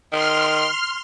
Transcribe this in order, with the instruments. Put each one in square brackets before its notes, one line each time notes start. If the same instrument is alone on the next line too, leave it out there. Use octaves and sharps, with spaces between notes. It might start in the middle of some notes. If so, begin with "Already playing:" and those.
[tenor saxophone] D#3 [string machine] C6 F6